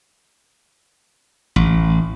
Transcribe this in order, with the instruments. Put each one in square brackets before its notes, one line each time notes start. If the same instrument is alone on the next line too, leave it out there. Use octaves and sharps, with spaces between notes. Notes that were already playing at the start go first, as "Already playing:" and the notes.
[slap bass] A1